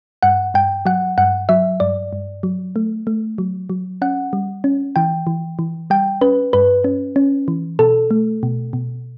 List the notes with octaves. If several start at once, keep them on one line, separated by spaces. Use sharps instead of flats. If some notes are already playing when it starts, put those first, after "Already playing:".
G2 F#5
G2 G5
F#3 F#5
G2 F#5
F#3 E5
G2 D5
G2
F#3
A3
A3
F#3
F#3
C#4 F#5
G3
C#4
E3 G5
E3
E3
G3 G5
C#4 B4
G2 B4
C#4
C#4
E3
B2 A4
A3
B2
B2